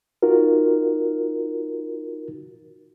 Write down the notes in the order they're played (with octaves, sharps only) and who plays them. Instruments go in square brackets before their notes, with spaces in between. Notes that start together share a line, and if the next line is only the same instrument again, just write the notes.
[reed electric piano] D#4 F4 F#4 A#4